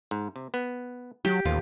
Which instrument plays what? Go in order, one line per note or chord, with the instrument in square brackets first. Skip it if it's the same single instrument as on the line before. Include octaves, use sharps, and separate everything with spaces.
[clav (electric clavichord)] G#2
C3
B3
[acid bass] F#3 [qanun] G4
[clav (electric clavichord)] A1 F4 [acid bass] D#2